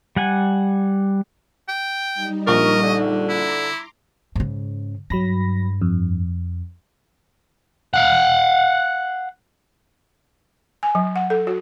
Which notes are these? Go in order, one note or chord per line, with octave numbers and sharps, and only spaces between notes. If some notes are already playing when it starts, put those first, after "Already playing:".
G3 F#5 G#5
G5
G3 D#4
A#1 A#4 D#5 C#6
D3
E4 A#5 C6 D6
G#2 C#3
G2 F#3 B5 A#6
F2
F5 F#5
G#5
F#3
F#5
A4
F#4